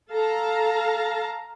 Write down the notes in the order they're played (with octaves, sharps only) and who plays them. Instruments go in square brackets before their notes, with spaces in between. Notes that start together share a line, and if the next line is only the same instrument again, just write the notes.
[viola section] A4 F5 A5 A#5